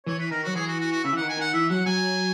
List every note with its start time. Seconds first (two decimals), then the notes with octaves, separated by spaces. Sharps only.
0.06 E3 C#5
0.19 B4
0.31 D#3 A#4
0.43 F#3 F#4
0.55 E3 G#4
0.68 F#4
0.80 F#4
0.92 F#4
1.04 C#3 E5
1.13 E3
1.16 D#3 F#5
1.29 G#5
1.37 D#3 F#5
1.53 E3 E5
1.70 F#3 F#5
1.86 F#3 G#5